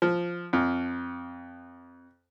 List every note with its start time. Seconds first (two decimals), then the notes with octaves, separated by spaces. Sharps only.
0.02 F3
0.53 F2